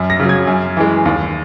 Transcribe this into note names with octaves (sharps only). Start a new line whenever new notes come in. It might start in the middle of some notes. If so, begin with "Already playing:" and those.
Already playing: F#2
A#6
C#3 F#3
G#6
F#2
E3 G#3
D#2